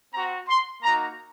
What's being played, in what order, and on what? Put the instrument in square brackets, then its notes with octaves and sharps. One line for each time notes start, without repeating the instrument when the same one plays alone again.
[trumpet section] C4 F#4 A#5
C6
A#3 D#4 F#4 A#5